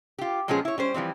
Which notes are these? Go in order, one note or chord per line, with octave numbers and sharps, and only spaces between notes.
F4 G4
A#2 F3 G#3 B3 C#4 G#4
E4 C#5
G3 C#4 C5
E3 F3 G3 C4